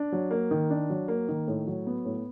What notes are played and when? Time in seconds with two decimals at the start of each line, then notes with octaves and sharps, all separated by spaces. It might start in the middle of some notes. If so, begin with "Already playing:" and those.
Already playing: D4
0.12 F#3
0.31 A#3
0.51 D#3
0.70 D4
0.90 F#3
1.08 A#3
1.29 D#3
1.48 A2
1.67 F#3
1.87 B3
2.05 A2